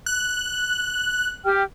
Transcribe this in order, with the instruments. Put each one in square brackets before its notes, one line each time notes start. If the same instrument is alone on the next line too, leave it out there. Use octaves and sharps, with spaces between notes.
[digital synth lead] F#6
[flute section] G4 G5 F6